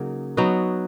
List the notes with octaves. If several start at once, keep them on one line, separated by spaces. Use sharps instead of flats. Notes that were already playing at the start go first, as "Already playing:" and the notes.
Already playing: C#3 F#3 A#3 D#4
F#3 B3 D#4 F#4